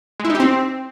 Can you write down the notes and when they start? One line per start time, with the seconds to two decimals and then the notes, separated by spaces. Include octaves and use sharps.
0.20 G#3
0.25 E4
0.30 D#4
0.35 G4
0.40 C4